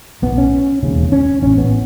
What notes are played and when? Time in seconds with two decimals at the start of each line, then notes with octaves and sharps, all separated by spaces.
0.22 B1 A2 B3
0.38 C#4
0.83 E1 D#2 C#3
1.12 C#4
1.42 A1 A2 C#4
1.58 B3